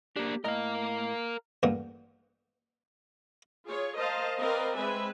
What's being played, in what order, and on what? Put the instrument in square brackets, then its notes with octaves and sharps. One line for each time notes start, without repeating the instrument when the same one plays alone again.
[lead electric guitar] A#3 D4 [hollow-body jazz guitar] G4
[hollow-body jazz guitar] A2 D#5 [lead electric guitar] A#4 F5
[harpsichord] A1 G2 A#2 F#5
[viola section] F4 G#4 C#5
A#4 C5 D#5 F5 A5
C4 A#4 B4 D5 D#5 F5
G#3 C4 B4 E5 G#5